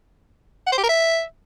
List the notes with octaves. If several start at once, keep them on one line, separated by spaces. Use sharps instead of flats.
F#5
C5
G4
A#4
E5